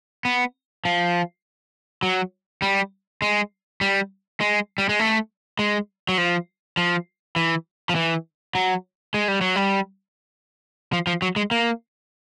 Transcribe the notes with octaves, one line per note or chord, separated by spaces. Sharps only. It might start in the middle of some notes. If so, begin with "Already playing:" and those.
B3
F3
F#3
G3
G#3
G3
G#3
G3
G#3
A3
G#3
F#3
F3
F3
E3
F3
E3
F#3
G#3
G3
F#3
G3
F3
F3
F#3
G#3
A#3